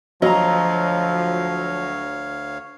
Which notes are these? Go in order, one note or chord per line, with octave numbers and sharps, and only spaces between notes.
D2 F3 F#3 C#5 D#5 F5 A#5